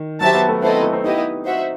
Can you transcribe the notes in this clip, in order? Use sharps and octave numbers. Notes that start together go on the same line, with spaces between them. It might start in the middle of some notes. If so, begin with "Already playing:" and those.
Already playing: D#3
F#3 G4 C5 E5 A5
B3
A3
B3 C4 E4 A4 C5 D#5
A3
C4
B3 D#4 E4 G4 D#5
F#4 C5 E5